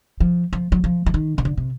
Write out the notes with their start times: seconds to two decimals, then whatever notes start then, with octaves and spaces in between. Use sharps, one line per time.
0.20 F3
0.53 F3
0.72 F#3
0.84 F3
1.06 E3
1.14 D#3
1.38 C#3
1.45 D3
1.57 C3